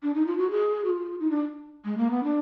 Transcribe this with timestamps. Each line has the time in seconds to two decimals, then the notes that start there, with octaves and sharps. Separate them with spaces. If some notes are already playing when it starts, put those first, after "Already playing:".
0.03 D4
0.14 D#4
0.26 F4
0.38 F#4
0.50 G#4
0.84 F#4
0.89 F4
1.20 D#4
1.30 D4
1.85 G#3
1.98 A#3
2.11 B3
2.23 D4